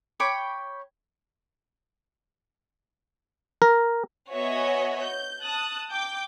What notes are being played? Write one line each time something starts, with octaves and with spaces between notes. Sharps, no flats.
C#5 G5 B5 D6
A#4
B3 F#4 C#5 D#5 E5 G#5
G6
A5 D#6 F#6
G5 D6 G6